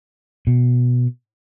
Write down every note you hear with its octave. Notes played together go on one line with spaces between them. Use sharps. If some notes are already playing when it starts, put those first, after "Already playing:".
B2